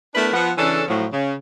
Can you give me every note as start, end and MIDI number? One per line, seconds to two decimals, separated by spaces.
0.15 0.30 57
0.15 0.30 59
0.15 0.30 62
0.15 0.30 64
0.15 0.30 70
0.15 0.30 71
0.33 0.51 53
0.33 0.51 59
0.33 0.51 78
0.58 0.83 49
0.58 0.83 52
0.58 0.83 61
0.58 0.83 62
0.58 0.83 69
0.88 1.05 45
0.88 1.05 53
0.88 1.05 54
1.13 1.35 49